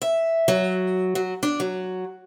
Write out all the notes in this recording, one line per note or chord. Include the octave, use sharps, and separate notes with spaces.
E5
F#3
F#3
D4
F#3